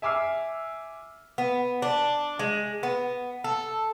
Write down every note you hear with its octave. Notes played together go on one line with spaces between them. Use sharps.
E5 G#5 D6 E6 F6 C7
B3
D4
G#3
B3
A4